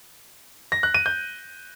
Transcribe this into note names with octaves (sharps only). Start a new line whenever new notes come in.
A#6
F#6
D#7
G6